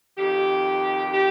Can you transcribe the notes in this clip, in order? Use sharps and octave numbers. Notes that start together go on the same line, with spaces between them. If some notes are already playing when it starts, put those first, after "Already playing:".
F2 D#3 G4
G4